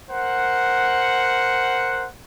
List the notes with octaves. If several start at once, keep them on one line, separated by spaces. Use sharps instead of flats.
A#4 C5 F#5